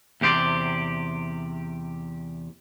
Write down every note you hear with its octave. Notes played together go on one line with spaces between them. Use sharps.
E2 C3 G4 C5 D5